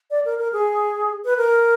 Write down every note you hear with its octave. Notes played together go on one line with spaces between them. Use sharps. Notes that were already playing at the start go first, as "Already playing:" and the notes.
D5
A#4
A#4
G#4
B4
A#4